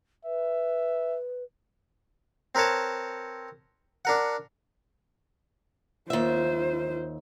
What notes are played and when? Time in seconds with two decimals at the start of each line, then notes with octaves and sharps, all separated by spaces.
0.25 B4 E5
2.55 C4 A#4 B4 C#5 A5
4.05 D4 A#4 F#5
6.10 D#2 F4 C5 E5